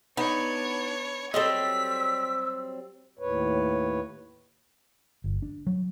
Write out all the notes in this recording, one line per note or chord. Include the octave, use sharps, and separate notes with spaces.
B3 D4 D#4 C#5
F#3 G3 C4 A4 D#5 E6 B6
D#2 A2 B4 C#5
G1
D4
F#3